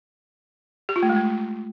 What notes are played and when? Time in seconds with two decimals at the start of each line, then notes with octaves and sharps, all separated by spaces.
0.89 G4
0.96 F4
1.03 A3
1.09 G#3
1.16 A3